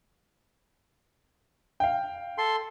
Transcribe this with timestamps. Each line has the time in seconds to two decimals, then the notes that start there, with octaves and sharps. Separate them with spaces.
1.80 F5 G5
2.38 A4 C6